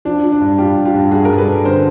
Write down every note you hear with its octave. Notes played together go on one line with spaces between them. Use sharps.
F3 D4
F3
D4
G2
G2 F4 G4
G2
F4 G4
G2
G2 F#4 G#4
G#4 A#4
G2
A4 B4
G2
D3 A#4 C5